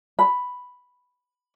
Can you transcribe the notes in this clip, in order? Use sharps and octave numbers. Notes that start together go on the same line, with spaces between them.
B5